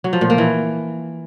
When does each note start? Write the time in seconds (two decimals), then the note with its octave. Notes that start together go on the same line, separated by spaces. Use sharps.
0.04 F#3
0.13 F3
0.21 A#2
0.30 A#3
0.38 E3